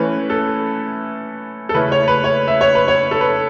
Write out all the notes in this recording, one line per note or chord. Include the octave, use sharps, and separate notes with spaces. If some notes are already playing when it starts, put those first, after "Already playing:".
Already playing: E3 A3 C#4 E4 B4
A4
A4
C#3 A3 C#4 E4 B4
C#5
B4
C#5
E5
C#5
B4
C#5
A4
B4